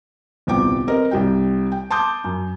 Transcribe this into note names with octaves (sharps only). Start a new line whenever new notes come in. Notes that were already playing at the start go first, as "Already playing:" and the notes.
D#1 C2 B3 G5 D6
C4 A#4 B4 D#5
C2 G3 G5
G5
A5 C6 D6 D#6 G6
F#2